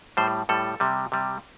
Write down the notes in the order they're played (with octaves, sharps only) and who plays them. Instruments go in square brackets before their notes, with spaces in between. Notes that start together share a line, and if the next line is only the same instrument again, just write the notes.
[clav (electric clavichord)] A2 G3 C5
A2 G3 A4
C3 G3
C3 G3